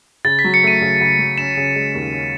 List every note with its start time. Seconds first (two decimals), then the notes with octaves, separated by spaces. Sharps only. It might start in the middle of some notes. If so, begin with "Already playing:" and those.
0.25 C#3 A6
0.39 B6
0.44 F#3
0.54 C#7
0.63 A3 D#7
0.82 C#3
1.01 C#3
1.19 F#3
1.38 C#4 E7
1.57 C#3
1.76 G#3
1.94 D#2
2.13 C#4